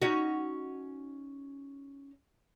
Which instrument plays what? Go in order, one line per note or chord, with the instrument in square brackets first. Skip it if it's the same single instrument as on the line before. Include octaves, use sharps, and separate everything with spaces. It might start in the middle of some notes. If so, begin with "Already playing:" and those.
[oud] C#4 D#4 F#4